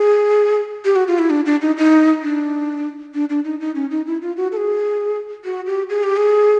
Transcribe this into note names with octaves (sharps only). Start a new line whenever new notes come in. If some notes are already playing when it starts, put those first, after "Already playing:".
Already playing: G#4
G4
F#4
F4
E4
D4
D4
D#4
D#4
D4
D4
D4
D#4
D#4
C#4
D#4
E4
F4
F#4
A4
G#4
F#4
G4
G#4
G4
G#4